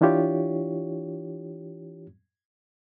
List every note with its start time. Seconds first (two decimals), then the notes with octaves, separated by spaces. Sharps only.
0.01 E3 D4 E4 F4 G4 C#5